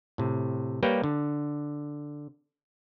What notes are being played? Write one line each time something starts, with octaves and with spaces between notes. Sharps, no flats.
A2 C3
G3 A#3 G4 B4 C#5 G5
D3